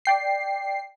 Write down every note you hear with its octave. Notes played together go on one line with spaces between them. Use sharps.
D5 G5 C7